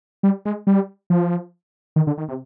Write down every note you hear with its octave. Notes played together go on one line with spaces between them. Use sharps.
G3
G#3
G3
F3
D#3
D3
D#3
C3